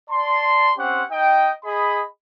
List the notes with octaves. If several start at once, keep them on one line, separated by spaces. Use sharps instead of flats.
D5 A5 C6
C4 C#4 G4 C5 F#5
D#4 D#5 G5
G#4 D#5 B5